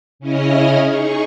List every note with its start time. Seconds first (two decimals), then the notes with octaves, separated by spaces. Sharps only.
0.19 C#3 C#4 E4 D#5 D#6 F6
0.83 D#4 G#4 C#6